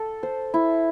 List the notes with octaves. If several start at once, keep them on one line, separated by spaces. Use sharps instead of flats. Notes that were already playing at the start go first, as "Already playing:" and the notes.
Already playing: A4
C5
E4